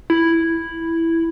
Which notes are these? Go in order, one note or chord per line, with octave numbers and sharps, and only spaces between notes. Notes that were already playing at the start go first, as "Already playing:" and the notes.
E4